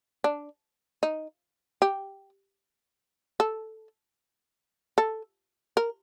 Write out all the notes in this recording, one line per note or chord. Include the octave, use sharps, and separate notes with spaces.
D4
D#4
G4
A4
A4
A#4